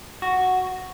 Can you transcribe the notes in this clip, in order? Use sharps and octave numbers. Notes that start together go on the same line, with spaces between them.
F#4